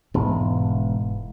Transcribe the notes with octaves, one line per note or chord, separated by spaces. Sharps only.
E1 G#2